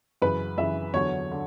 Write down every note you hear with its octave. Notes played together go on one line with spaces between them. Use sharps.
F#2 C#3 E3 B4
F#2 C#3 E3 E5
E2 D3 F#3 C#5
D3